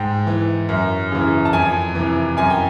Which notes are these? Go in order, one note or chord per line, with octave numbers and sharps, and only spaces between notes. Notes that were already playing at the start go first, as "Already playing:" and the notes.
Already playing: G#2 G5
E3
F#2
C#3 E3
A5
F2 G#5
C3 E3
F#2 G#5
G5